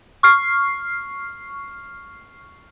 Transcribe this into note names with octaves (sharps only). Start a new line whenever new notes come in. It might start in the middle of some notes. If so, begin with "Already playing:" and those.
C#6 F6 C7